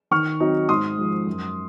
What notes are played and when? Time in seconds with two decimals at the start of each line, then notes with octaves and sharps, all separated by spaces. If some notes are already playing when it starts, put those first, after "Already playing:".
0.11 D#3 C#6 F6
0.40 F#3 C4 D#4
0.69 G#2 C6 D#6
0.98 F3 G#3
1.27 F#2